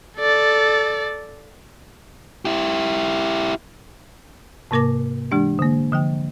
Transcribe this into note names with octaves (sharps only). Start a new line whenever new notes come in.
A4 D5
E4 G4
G#2 C3 A#3 A#4 D6 A#6
E3 G#3 D4 G4
D3 A#3
D3 F3 G5